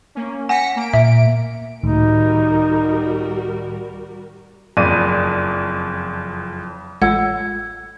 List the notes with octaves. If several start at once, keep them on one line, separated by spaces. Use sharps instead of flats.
A#3 C#4
F#5 G#5 A#6 B6 C#7
A#3 D7
A#2 E5
C#2 A2 D#3 G3 D#4 F#4 A#4
F#1 F2 D5 D#7
A1 G#3 F4 A4 C#5 F#5 E6 G#6